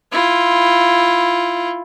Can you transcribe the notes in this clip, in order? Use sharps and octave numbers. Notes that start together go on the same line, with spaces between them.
E4 F4